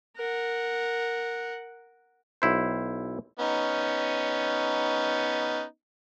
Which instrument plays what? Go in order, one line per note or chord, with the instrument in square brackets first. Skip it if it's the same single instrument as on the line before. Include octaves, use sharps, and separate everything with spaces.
[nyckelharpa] A#4 F#5
[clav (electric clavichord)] B1 E4 C5
[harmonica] B3 C#4 D#4